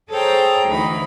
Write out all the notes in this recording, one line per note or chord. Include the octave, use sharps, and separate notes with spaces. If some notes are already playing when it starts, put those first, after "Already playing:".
G#4 A4 C5 C#5 G5 A#5
D2 E3 D#4 B5